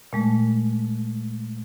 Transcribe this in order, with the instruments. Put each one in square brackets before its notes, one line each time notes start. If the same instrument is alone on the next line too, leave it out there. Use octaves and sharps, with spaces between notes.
[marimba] A#2 G#3 A3